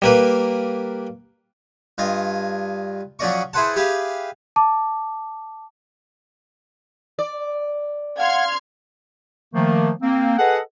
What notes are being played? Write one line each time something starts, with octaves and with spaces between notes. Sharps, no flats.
G3 A#3 B4
G2 F4 D#5 G#5
F2 F#3 C#4 D5 D#5 C#6
E4 G#4 B4 C5 F#5 A5
G4 G#4 B4 E5 F5
A5 D6
D5
F5 F#5 C6 F6 G#6
D#3 F3 A3 A#3
A#3 C4
G#4 A4 B4 D#5 F#5